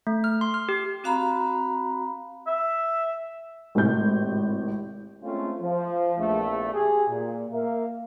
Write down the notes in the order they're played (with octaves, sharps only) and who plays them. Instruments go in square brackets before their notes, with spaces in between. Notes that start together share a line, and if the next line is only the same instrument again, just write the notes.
[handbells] A3
F6
C6
F6
G4
[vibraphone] C4 F#4 F5 A#5 B5
[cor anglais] E5
[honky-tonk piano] G#1 A2 C3 G6
[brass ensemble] G#3 A3 C4 C#4 E4 F4
F3
A#1 E2 A3
G4 G#4
A#2
A#3 A#4 E5 F5